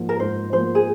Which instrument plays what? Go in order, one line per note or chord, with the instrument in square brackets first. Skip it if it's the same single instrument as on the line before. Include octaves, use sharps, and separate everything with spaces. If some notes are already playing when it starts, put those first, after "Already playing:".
Already playing: [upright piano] G#2 F3 A#3
[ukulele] A#4
[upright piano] G#2 [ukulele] C5
[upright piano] F3 A#3 [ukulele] C5
[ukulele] G#4